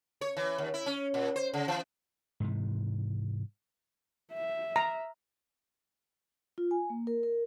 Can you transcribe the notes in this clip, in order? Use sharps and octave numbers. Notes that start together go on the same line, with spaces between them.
C#5
E3
D#2
E4
C#4
A#2
C5
C#3
E3
G#2 C3 E3
E5
A#5
F4
G#5
A#3
A#4
A#4